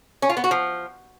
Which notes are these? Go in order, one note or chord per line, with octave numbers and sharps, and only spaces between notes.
C#4
F4
B3
F#4
F3